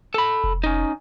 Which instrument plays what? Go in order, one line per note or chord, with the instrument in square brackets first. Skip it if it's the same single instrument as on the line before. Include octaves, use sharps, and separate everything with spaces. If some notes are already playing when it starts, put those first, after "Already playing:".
[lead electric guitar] A4 B5
[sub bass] F1
[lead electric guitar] C#4 D#4